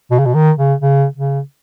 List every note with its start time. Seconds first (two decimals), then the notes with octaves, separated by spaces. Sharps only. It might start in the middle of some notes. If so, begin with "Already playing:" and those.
0.11 B2
0.19 C#3
0.26 B2
0.34 D#3
0.58 C#3
0.81 C#3
1.16 C#3